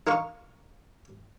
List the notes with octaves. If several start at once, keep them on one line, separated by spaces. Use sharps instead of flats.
D#4 A#4 F5 C#6